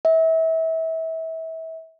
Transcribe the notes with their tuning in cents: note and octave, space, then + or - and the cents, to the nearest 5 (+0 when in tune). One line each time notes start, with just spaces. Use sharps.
E5 -30